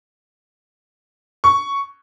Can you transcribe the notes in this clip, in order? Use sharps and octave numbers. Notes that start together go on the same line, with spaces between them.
C#6